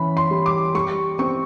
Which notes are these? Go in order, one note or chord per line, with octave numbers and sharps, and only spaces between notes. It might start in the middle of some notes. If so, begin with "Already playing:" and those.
Already playing: E3 C#4 B5
C6
G3
D6
G3 C#6
C4 C#6